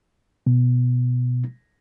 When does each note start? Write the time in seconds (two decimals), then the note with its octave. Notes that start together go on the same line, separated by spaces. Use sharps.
0.47 B2